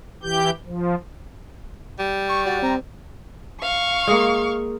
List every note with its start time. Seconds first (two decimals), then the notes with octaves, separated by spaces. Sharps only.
0.23 E3 G4 G6
0.67 F3
1.99 G3
2.29 C#6
2.45 F#4 D5
2.62 C4 A#5
3.62 F5 C#6
4.07 G#3 A#3